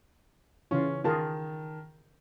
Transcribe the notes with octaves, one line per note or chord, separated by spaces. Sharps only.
C#3 E3 C#4 F4
D#3 F4 G#4 A#4 A5